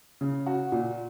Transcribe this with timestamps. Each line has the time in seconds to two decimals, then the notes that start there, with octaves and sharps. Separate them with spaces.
0.21 C#3
0.46 F#4
0.72 A#2